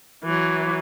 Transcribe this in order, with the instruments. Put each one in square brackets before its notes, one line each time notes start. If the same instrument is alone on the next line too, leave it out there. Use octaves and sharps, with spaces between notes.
[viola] E3 F#3